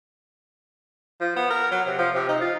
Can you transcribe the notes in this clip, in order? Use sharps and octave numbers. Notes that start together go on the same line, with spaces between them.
F3
B3
A#4
F#3
C3
F3
C3
D#4
F4